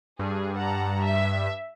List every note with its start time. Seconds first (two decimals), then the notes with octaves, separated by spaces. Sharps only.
0.19 G2 G#4
0.57 F#5 A5 A#5
1.03 E5